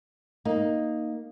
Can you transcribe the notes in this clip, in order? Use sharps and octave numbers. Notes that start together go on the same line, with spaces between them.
A#3 D#4